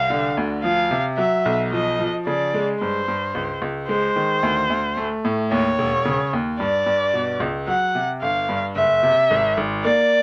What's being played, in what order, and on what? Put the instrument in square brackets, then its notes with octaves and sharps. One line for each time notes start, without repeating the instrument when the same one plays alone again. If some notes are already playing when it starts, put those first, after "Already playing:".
Already playing: [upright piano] C2 [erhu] F5
[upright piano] D3
D2
[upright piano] F3 [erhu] F5
[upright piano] C3
[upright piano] F#3 [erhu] E5
[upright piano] B1
[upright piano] F3 [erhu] D#5
[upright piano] F3
[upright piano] C#3 [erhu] D5
[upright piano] G#3
[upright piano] G2 [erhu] C5
[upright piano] G2
C#2
C#2
[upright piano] G#3 [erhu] C5
[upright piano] D#3
D2
D2
A3
A2
[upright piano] D#2 [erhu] C#5
[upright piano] E1
C#3
D#2
[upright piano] G2 [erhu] D5
[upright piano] G2
B2
C#2
[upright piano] F#3 [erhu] F#5
[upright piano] C3
[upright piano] G1 [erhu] F5
[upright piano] G2
[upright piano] F#1 [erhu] E5
[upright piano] C3
G#1
G#1
[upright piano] A#3 [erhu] D5